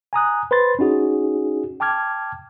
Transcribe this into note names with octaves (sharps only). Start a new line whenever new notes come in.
G#5 A#5 D#6 F#6
B4 C5 B5 C6 A6
C#4 D#4 F#4 G#4
G5 A5 D6 F6 G#6